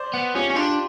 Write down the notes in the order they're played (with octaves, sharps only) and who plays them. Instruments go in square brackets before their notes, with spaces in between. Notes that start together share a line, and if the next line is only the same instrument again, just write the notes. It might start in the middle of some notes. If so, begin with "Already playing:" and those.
Already playing: [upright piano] C5 D5
[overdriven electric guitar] B3
[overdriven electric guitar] C#4 [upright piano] F4 G4
[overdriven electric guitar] C#4
[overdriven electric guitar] D4 [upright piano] F4 G4